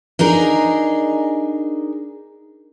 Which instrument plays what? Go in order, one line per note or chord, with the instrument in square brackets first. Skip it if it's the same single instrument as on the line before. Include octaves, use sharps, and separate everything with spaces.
[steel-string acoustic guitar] D4 D#4 G#4 A#4